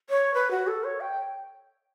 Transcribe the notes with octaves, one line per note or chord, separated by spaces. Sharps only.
C#5
B4
F#4
A4
C#5
G5